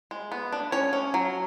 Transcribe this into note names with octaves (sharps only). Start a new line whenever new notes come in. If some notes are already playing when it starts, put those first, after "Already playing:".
G#3
B3
D4
C#4 C#5
C#4
F#3